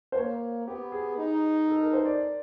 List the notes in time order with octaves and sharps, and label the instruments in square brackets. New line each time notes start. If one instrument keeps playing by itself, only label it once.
[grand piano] C5
[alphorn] A#3 [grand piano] C#5
[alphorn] B3 [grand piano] G4
[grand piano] G#4
[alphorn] D#4
[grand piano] A4
A#4
C5
D5